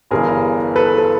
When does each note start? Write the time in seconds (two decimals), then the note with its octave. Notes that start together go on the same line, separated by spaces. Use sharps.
0.11 G1 G2 E3 G#4 A#4
0.76 A4 B4
0.98 A4